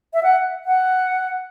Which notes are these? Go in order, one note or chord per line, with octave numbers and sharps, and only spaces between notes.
E5
F#5
F#5